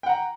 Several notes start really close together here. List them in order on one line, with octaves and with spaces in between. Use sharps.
G5 F#5 A#5